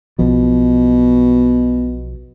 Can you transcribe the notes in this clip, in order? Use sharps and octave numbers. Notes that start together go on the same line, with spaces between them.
B1 B2 F3